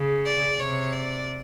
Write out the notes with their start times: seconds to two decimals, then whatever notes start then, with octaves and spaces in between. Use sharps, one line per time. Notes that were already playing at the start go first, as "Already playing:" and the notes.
Already playing: C#3
0.26 D5
0.60 C3 C#5
0.93 D5